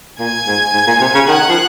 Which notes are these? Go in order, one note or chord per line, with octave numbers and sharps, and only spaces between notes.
A#2 G#5 G#6
G#2
G#2
A#2
C3
C#3
D#3 F#5 F#6
F3